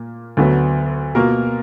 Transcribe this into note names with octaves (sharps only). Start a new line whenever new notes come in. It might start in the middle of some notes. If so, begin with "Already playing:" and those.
Already playing: A#2 A#3
D2 D3 F#3 B3
B2 A#3 F4 A#4